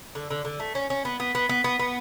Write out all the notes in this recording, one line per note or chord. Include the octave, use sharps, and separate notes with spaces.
D3
D3
D3
A3
C#4
C#4
B3
B3
B3
B3
B3
B3